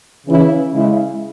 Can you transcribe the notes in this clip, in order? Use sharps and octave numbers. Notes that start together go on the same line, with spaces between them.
C#3 E3 C#4 E4
C#3 G#3 E4